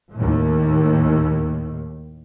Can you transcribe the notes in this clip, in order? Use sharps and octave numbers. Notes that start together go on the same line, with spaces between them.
D#2 A2